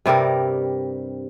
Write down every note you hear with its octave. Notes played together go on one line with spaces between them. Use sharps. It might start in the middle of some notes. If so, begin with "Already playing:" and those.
G2 C3 G3 A#4